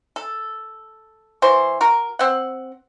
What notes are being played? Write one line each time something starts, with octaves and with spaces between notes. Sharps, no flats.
A4
E3 F#4 C5
F#4 A#4
C4 F#5